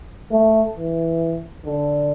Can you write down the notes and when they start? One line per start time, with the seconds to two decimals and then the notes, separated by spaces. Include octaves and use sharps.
0.31 A3
0.76 E3
1.65 D3